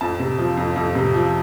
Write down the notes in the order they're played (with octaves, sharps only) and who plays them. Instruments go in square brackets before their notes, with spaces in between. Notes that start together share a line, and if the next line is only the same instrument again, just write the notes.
[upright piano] F2 A5
C3
F3
F2
F2
C3
F3